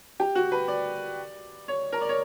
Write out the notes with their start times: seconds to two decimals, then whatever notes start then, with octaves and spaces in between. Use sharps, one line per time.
0.20 G4
0.35 F#4
0.52 B4
0.68 D5
1.68 C#5
1.92 A#4
2.01 D5
2.09 C#5